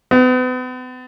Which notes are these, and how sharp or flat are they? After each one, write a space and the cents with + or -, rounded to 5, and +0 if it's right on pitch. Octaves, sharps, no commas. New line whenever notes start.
B3 +40